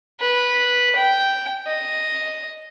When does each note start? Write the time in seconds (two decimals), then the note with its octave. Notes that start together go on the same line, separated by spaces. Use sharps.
0.20 B4
0.96 G5
1.67 D#5